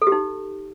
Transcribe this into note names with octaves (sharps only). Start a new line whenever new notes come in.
A4
G4
D#4